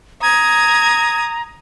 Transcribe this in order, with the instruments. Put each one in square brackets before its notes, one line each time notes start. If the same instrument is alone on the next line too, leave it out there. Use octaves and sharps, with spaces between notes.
[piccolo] A#5 [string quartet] D#6 G#6